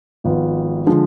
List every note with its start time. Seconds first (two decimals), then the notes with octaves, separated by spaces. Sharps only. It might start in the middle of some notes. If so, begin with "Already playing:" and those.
0.24 G#1 G#2 F3 B3 F4
0.87 D3 F3 G#3